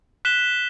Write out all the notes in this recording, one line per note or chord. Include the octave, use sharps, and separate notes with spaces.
F#6 B6 E7 G7